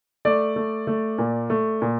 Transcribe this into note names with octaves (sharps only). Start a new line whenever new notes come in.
A3 D5
A3
A3
A#2
A3
A#2